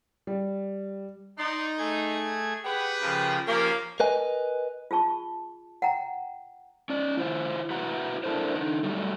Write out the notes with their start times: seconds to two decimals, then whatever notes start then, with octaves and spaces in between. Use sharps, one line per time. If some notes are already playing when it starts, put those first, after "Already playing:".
0.27 G3
1.38 D#4 D5 C6
1.78 A3 G#4 G#6
2.65 G4 G#4 B4 F#5
3.02 C#3 F3 A#4
3.47 F3 A#3 C#4 G4
4.00 A#4 B4 D#5 G#5
4.91 F4 G#4 A5 C#6
5.82 F#5 G5 A#5
6.90 C#4 D5
7.17 E4 F4 C5
7.70 E4 F#4 B4 E5 F#5 A#5
8.24 D4 E4 A4 A#4 C5
8.55 D3 D#4
8.83 F#3 G3 A3